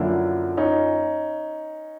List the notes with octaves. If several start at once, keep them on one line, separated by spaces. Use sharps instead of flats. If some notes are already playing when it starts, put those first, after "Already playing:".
Already playing: F#2 D3 F3 A#3 D4 E4
C#4 D#4